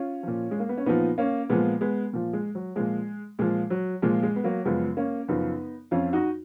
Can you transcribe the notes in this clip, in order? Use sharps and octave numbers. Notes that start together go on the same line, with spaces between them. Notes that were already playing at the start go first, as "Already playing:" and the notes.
Already playing: C#4 F4
A#2 F3
G#3
A#3
B3
C#4
A#2 F3 B3 D#4
A#3 C#4
A#2 F3 G#3 B3
G#3 B3
A#2 F3
G#3
F#3
A#2 F3 G#3
A#2 F3 G#3
F#3
A#2 F3 G#3
G#3
B3
F#3 A#3
F#2 C#3 F3 G#3 B3
A#3 C#4
F#2 C#3 F3 B3 D#4
F2 F3 C#4 F4
D#4 F#4